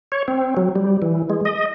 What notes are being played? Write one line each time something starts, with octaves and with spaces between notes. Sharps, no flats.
C#5
C4
F#3
G3
E3
G#3
D#5